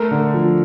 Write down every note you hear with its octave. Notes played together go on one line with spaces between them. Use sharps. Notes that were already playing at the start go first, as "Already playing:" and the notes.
Already playing: A3 A#4
D3
F3